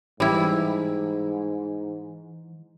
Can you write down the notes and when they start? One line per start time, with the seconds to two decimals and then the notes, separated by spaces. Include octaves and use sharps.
0.20 G#2 E3 G3 E4